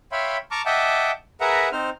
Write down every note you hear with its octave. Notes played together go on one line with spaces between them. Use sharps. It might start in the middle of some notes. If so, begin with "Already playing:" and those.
C#5 E5 F5 G5 B5 C6
A5 A#5 C#6 D6 F6
D#5 E5 F#5 G5 A5 D6
G#4 A#4 B4 E5 F#5 A#5
C4 D#4 C5 F6